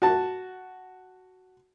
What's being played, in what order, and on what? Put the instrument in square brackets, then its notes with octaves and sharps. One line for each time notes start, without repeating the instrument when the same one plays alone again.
[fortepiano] F#4 A5